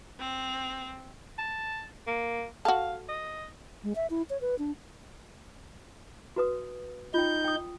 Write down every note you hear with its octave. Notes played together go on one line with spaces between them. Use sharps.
C4
A5
A#3
F#4 A4 F5
D#5
G#3
E5
E4
C#5
B4
D4
F#4 B4 D#6
D#4 F4 G5 G6
G5 D#6